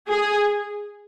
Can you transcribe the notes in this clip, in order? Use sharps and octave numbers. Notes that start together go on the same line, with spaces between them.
G#4